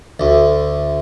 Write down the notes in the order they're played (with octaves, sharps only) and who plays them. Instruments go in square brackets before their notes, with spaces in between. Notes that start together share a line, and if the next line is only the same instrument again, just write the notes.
[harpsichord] D2